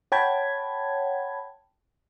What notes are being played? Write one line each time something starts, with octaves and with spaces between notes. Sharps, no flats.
C#5 F#5 G5 A5 B5 G#6